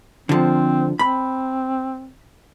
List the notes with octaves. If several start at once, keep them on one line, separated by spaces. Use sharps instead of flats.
D3 F3 C4
C4 B5